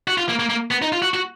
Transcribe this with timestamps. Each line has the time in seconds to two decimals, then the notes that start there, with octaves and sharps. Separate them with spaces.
0.08 F#4
0.18 F4
0.29 A#3
0.39 A#3
0.50 A#3
0.71 B3
0.82 D#4
0.92 F4
1.02 F#4
1.14 F#4